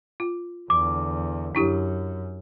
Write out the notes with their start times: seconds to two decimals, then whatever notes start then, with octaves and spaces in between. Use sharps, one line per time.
0.20 F4
0.70 E2 D3 D6
1.55 F#2 D4 E4 G4